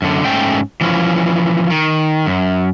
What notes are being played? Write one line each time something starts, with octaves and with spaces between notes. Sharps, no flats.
F#2 D3
G#2 A3 C#4 G5
E3 F3 C#4
D#3
F#2